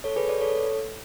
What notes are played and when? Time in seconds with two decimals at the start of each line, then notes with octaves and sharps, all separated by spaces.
0.04 A4 C#5
0.16 G#4 B4
0.29 B4 D5
0.41 A4 C#5